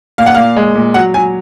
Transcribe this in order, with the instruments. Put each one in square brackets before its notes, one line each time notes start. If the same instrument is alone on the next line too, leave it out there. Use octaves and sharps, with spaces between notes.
[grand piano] A#2 [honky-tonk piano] F5
[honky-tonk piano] F#5
[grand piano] A#2 [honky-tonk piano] F5
[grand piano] G#3
A#2
[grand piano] F#3 [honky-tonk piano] F#5
[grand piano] F#3 [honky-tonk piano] G#5